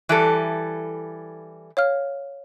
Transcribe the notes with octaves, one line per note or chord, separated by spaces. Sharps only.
E3 G3 A4 F#6
C#5 F5 F6